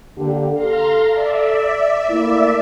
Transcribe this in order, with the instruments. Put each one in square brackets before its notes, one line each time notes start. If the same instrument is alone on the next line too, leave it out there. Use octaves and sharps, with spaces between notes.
[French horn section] D3 A#3 G4
[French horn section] A4 [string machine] F5 A#5 C6
[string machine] D5 E5
[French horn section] A3 A#3 E4